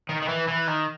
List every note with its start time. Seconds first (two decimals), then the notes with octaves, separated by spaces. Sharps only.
0.09 D#3
0.22 D#3
0.29 E3
0.48 E3
0.67 D#3